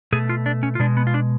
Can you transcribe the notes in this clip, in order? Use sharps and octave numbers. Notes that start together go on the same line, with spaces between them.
B2 A3 G#4
F4
D4
C#4
F4
B2 G#3 D4
B3
F4
D4